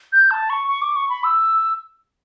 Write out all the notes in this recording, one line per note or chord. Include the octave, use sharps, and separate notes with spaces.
G6
A5
C#6
C#6
D6
C#6
B5
E6